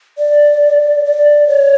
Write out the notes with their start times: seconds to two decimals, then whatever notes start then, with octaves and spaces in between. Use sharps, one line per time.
0.18 D5
1.05 D5
1.48 C#5